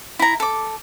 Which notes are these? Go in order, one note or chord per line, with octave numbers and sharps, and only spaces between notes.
E4 A#5
A4 D6